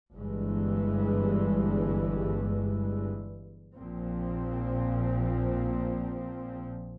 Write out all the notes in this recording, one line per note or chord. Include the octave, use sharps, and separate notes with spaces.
G1 G2 E3 G#3
A#1 A#2 F3 C4